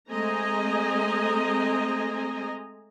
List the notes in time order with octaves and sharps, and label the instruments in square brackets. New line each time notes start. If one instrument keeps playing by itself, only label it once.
[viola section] G#3 A3 C4 D#5 G#5 A#5